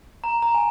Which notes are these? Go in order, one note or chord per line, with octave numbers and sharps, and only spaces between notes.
A#5
A#5
G#5